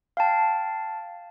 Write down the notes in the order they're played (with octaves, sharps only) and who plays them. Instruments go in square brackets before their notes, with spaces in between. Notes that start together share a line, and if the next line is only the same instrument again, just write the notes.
[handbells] F5 G5 A5